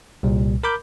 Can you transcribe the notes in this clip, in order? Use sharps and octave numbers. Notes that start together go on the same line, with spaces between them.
C2 A#2 G3
A#4 B5 D6 G6